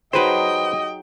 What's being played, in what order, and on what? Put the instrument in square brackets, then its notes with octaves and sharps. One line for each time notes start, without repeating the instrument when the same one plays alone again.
[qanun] F#3 D#4 G#4 [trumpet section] G4 D#5 [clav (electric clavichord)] B4 C5 [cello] G5